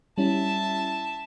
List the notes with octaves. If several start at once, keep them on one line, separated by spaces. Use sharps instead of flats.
G3 C#4 E4 E5 A5